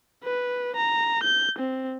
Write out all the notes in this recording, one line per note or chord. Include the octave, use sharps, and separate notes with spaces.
B4
A#5
G6
C4